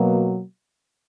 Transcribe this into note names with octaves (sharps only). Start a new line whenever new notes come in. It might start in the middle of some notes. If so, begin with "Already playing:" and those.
Already playing: B2 F#3 A#3